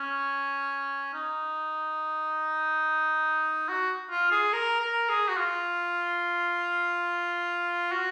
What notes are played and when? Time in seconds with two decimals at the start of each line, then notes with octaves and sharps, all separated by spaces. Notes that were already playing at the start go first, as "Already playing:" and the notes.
Already playing: C#4
1.14 D#4
3.68 F#4
4.10 F4
4.31 G#4
4.53 A#4
4.80 A#4
5.09 G#4
5.28 F#4
5.37 F4
7.92 F#4